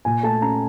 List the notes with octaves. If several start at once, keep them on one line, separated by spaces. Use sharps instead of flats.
A#2 G#5
A3 A5
C#4 A#5